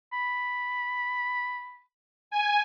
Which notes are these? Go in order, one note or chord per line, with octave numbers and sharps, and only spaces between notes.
B5
G#5